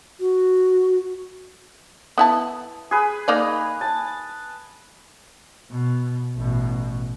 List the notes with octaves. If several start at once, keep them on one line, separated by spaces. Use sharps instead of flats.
F#4
B3 E4 A5
G#4 B4
A#3 D#4 D5
A5
B2
A1 B2